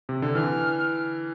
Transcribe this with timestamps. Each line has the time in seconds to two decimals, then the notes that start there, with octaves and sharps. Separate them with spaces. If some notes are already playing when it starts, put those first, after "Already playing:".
0.09 C3
0.22 D3
0.35 E3 F6